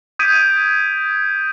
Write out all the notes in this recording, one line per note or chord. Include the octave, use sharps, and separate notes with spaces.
D#6 G6 G#6 B6 D7 D#7